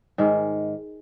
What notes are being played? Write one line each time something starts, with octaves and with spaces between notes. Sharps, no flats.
G#2 D#3 G#3